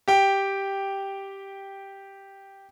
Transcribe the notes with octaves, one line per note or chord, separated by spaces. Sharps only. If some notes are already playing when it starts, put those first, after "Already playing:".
G4 G5